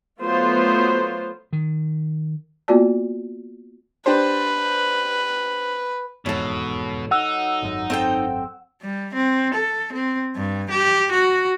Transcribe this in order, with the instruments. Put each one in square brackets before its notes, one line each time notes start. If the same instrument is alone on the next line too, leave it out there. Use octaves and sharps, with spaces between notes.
[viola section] F#3 A3 B3 F4 C5
[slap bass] D#3
[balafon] A#3 B3 F4 F#4 D5 A5
[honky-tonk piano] D4 G4 C5 [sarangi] B4
[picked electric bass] F1 E2 G#2 [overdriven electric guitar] B2 [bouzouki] F#3 A4
[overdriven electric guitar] D#4 [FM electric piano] F#5 E6
[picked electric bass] G#1 F#2
[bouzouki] C4 A4 G5
[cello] G3
C4
A4
C4
G2
G4
F#4